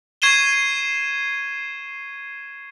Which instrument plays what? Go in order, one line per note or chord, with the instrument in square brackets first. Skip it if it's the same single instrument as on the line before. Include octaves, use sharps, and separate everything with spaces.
[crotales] C#6 G#6 C7 D#7 E7 G7